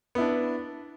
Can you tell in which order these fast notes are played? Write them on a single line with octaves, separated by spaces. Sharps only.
B3 E4 D4